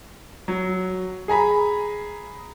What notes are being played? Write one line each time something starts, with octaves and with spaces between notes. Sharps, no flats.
F#3
G#4 G#5 A#5 B5